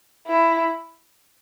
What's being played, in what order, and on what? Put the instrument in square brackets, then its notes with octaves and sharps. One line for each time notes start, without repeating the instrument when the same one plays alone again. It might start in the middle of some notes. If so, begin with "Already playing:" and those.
[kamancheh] E4